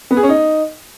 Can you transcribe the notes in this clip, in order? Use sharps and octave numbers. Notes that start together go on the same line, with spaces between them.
B3
G#4
C#4
D#4